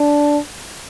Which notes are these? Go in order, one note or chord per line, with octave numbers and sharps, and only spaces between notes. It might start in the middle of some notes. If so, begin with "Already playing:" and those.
Already playing: D4